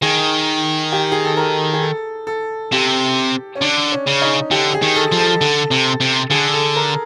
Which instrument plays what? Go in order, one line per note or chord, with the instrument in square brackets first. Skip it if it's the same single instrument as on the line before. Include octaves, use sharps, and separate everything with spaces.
[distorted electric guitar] D#3 [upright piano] G#4
[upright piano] G4
G#4
A4
A#4
G#4
A4
A4
[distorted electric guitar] C3 [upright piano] G4
[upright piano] C#4
[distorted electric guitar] D3 [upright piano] D4
[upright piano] C#4
[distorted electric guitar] C#3
[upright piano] D#4
[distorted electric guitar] D3 [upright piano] G4
[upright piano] G#4
[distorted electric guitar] D#3
[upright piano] A4
[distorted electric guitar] F3
[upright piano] A4
[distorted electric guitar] D3 [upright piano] A4
[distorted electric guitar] C3
C3
[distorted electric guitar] D3 [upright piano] G#4
[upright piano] A4
A#4